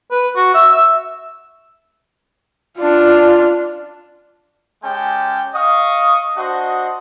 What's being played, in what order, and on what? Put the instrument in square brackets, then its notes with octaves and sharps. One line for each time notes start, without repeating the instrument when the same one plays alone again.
[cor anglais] B4
F#4
E5
E5
[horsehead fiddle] D4 F4
[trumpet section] G#3 C#4 G4 G5 A5
D#5 F5 C#6 D#6
D4 F#4 C5 D#5